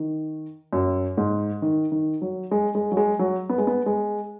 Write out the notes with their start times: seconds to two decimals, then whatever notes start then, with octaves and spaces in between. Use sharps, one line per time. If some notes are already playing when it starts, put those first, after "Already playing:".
Already playing: D#3
0.73 F#2
1.17 G#2
1.62 D#3
1.92 D#3
2.22 F#3
2.51 G#3
2.75 G#3
2.92 F#3
2.97 G#3
3.19 F#3
3.49 B3
3.58 G#3
3.67 B3
3.86 G#3